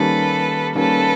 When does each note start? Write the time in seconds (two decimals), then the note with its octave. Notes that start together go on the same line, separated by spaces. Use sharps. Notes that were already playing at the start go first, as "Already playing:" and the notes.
Already playing: D#3 G3 A#3 C#4 A4 B4
0.75 D#3 G3 A#3 C#4 A4 B4